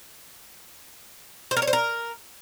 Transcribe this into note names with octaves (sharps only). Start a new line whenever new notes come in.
C5
A#4
C#5
C5
A#4